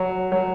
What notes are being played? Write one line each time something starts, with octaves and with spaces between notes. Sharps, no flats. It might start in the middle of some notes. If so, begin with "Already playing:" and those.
Already playing: F#3
F#3